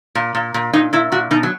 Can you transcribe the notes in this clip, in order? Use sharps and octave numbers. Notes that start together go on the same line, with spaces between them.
A#2
A#2
A#2
A#2 D#4
A#2 E4
A#2 F#4
B2 D#4
F#3